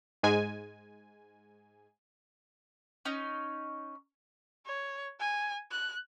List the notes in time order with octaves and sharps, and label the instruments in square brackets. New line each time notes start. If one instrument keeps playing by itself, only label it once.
[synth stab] G#2 G#3 G#5
[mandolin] C#4 D#4
[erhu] C#5
G#5
F#6